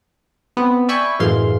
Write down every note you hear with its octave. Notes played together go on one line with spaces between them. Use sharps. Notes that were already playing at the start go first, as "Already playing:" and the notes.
B3 C4
D5 E5 G5 G#5 B5 C#6
F#2 A2 E3 G#3 F5 C6